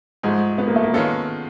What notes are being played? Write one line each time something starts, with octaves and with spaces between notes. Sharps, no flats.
G#2 F3 G#3 A3
B3
A#3
A3
A#3
D#3 G#3 B3 C#4 F4 A4